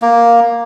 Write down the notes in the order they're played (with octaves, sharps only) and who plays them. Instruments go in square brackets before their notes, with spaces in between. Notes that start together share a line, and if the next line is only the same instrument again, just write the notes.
[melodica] A#3